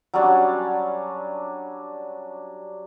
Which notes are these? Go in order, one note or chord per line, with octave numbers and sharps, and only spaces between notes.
F#3 G3 C#4 D4